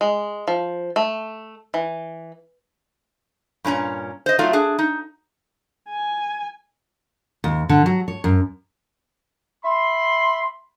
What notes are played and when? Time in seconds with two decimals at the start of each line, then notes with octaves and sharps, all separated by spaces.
0.01 G#3
0.48 F3
0.96 A3
1.74 E3
3.64 G2 A#2 C#4 A#5
4.26 C5 D#5
4.39 F#3 A3 D#4 F4 F5
4.53 D4 G#4
4.79 D#4
5.90 G#5
7.44 D#2
7.69 D3
7.86 F#3
8.08 C#5
8.24 F#2
9.65 E5 B5 C6